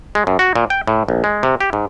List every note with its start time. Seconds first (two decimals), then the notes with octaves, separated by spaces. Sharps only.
0.15 G#3
0.27 F#2
0.39 F#4
0.56 A#2
0.70 G5
0.87 A2
1.09 A#1
1.24 G#3
1.43 C3
1.60 G4
1.73 G#2